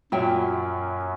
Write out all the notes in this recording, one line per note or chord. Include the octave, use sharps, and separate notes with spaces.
F#2 A#2 F#3 E5 G5